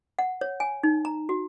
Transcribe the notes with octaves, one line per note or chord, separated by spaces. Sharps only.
F#5
C#5
G#5
D#4
A#5
F#4